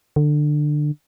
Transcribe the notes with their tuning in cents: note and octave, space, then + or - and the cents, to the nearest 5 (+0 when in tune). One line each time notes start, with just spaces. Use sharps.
D3 +20